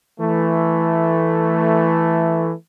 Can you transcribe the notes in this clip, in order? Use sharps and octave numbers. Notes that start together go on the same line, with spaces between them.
E3 A3